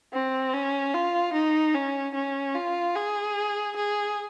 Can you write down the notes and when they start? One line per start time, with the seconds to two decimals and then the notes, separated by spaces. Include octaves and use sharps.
0.13 C4
0.54 C#4
0.94 F4
1.34 D#4
1.75 C#4
2.15 C#4
2.55 F4
2.96 G#4
3.77 G#4